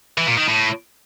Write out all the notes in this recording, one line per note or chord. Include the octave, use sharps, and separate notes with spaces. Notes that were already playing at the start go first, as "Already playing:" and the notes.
E3
A#2
D#3
A2